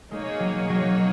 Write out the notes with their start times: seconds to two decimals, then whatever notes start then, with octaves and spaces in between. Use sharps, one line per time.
0.11 B2 G#3 A#3 D#4 G#4 C#5
0.40 F#3
0.69 F#3